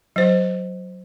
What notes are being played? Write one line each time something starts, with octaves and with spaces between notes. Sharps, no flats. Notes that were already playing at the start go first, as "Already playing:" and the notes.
F#3 C5